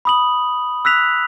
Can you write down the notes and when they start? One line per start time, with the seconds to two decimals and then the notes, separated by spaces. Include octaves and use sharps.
0.05 B5 D#6 F#7
0.85 E6 F#6 B6 F7